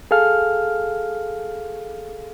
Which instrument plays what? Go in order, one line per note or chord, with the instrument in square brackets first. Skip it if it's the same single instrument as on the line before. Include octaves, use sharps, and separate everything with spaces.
[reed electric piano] G#4 A4 F5 F6